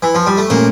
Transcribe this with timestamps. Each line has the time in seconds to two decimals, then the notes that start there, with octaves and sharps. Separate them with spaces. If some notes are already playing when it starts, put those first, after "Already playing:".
0.02 E3
0.15 F3
0.26 G3
0.38 A3
0.50 A#2 F3 A3 A#3 C#4